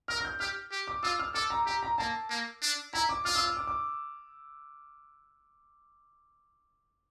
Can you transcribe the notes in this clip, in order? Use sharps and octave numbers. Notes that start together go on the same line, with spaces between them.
A#4 F6
F6
G6
G4 F6
G4
D6
F4 E6
F6
A4 D6
A#5
G4 A#5
A#5
A#3 A5
A#3
D4
E4 A#5
D6
F4 F6
E6
F6
D6
D6